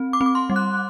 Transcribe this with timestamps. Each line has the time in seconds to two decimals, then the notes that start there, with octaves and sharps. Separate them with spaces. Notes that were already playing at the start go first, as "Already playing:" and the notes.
Already playing: C4
0.13 D6
0.21 C4
0.26 D6
0.35 C6
0.50 G3
0.56 F#6